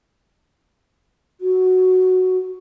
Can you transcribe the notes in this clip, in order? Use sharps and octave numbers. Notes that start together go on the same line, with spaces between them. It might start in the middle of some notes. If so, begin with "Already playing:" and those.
F#4